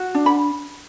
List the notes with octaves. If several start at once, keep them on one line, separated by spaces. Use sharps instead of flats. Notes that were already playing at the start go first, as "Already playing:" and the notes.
Already playing: F#4
D4
B5